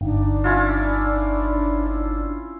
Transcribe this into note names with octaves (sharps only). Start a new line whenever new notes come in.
G1 D4 D#4
C#4 E4 F4